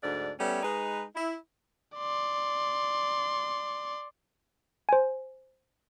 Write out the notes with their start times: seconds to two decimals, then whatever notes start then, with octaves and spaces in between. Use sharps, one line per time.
0.03 D2 G#2 D4 D5
0.40 G3 A3 B3 C#4
0.63 G#3 D#4 B4
1.15 E4
1.97 D5 C6
4.89 C5 G#5